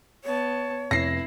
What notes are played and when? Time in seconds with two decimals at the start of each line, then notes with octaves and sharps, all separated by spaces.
0.24 B3 C#5 A5
0.91 F1 E4 A#6 C7